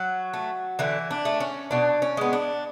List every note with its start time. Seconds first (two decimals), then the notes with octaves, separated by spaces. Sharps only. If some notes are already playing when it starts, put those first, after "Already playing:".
Already playing: F#3 F#4
0.33 A3
0.79 D3 E3 E4
1.11 D4
1.25 A3
1.40 C#4
1.71 B2 D4
2.02 C#4
2.17 G#3 B3
2.33 D4